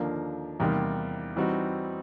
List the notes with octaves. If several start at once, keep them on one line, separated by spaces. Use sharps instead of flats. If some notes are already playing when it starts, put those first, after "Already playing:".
Already playing: D#2 D3 F3 A#3 D4
E2 C3 D#3 G3 A#3
E3 G3 C4 D#4 F#4